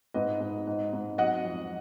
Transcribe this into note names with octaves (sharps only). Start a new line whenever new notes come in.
G#2 B4 D#5
G#2
G#2
G#2
F#3 D#5 F#5
F2